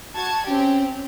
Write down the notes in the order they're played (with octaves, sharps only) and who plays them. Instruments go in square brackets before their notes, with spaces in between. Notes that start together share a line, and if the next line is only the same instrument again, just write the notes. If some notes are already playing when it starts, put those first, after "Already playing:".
[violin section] F#4 A5 G#6
[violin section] C4 G4 [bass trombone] C#4